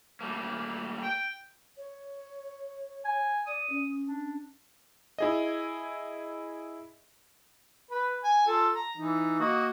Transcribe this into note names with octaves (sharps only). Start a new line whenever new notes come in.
G3 A3 A#3
G5
C#5
G#5
D5 D#6
C#4
D4
E4 G#4 D#5
B4
G#5
F4 A4
A#5
E3 D#4
A#3 F#4 D#5